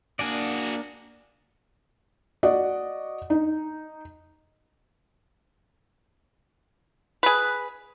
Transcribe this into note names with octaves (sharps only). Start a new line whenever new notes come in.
A#3 D4 F#4 G#4 D5
F#4 D5 D#5 F#5
D#4
G#4 B4